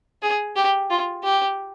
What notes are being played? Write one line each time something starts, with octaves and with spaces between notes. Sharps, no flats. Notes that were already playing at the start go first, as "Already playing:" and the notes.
G#4
G4
F4
G4